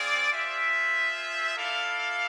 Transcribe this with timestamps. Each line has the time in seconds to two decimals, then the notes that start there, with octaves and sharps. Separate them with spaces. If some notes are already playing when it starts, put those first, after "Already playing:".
Already playing: C4 G#4 D5 F5
0.32 F4 G#4 C5 E5
1.56 E4 A4 D5 F5